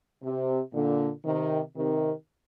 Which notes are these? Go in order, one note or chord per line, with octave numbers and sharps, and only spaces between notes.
C3
A#2 D3
C3 D#3
C3 D#3